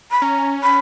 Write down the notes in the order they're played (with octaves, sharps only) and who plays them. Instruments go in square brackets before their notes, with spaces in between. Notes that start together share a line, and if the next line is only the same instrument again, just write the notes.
[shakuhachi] B5
[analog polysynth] C#4 [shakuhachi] A#5
[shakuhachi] B5